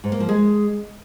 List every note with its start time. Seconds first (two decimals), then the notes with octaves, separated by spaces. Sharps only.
0.04 G#2
0.12 A#3
0.20 F3
0.29 G#3